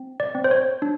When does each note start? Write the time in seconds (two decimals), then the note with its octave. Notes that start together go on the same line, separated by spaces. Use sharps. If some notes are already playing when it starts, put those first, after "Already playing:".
Already playing: C4
0.20 D5
0.35 C4
0.44 C5
0.51 C#5
0.82 D4